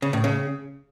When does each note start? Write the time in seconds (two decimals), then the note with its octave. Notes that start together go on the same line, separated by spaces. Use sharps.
0.02 C#3
0.13 A2
0.24 C#3